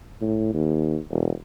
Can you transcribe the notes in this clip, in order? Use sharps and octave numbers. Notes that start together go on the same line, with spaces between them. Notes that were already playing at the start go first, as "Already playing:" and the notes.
A2
D#2
E1